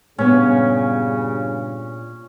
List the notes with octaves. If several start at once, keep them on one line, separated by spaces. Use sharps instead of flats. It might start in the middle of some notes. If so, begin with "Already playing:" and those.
G2 A#2 C#3 B3 C#4